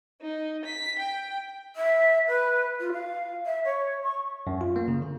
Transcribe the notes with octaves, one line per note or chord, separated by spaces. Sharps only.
D#4
B6
G5
E5
B4
F4
F5
E5
C#5
C#6
F#2
F4
A#3
C#3
D3